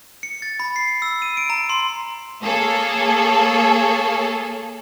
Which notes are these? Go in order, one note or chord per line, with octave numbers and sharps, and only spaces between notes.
C#7
A6
B5
C7
E6
D#7
D7
A#5
C6
A#3 G#4 A4 C#5